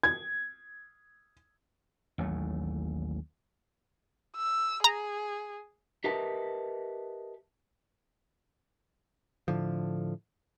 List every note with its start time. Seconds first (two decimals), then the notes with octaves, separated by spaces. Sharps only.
0.03 G#6
2.18 A1 D#2 F#3 A3
4.36 E6
4.84 G#4 A#5
6.04 G4 A#4 B4 D#5 E5 A5
9.48 A2 D3 F3